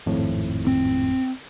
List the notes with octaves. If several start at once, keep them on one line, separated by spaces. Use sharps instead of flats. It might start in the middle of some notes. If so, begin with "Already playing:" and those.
G#1 F2 A2
C4